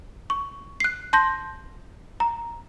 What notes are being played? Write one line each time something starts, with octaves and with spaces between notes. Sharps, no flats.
C#6
F#6 C7
A5 C6 G6 A#6
A#5